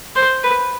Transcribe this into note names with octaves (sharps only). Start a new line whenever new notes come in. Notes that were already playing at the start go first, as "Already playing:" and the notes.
C5
B4